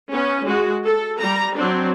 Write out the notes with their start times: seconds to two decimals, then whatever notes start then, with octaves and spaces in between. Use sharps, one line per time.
0.12 B3 C#4
0.44 G#3 F#4
0.86 A4
1.18 G3 A#5
1.55 F#3 C4 D4